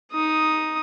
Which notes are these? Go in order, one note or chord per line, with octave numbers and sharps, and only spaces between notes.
D#4 D#6